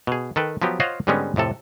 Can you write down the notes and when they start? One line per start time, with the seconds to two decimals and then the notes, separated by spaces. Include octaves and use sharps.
0.07 B2 G#4
0.36 D#3 A4 B4 G5
0.62 F3 F#3 B3 G4
0.80 F4 C5 C#5 D#5 F5 F#5
1.07 G#2 D3 G3 G#3 B3 C#4
1.36 F2 A2 C3 A4